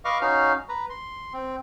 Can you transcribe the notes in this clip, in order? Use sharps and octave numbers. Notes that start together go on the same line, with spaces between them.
B4 D#5 F5 C#6 D6
C#4 D#4 F#4 F5
B4 A#5
C6
C4